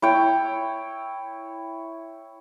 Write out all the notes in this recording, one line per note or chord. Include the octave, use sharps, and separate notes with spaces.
E4 C#5 G5